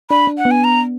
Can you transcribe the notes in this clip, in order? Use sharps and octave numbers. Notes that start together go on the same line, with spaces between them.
D4 B5
D4
F#5
B3
G#5
A#5